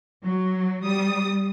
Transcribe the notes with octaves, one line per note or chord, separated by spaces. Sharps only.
F#3
G3 D#6